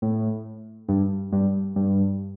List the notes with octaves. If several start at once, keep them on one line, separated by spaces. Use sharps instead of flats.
A2
G2
G2
G2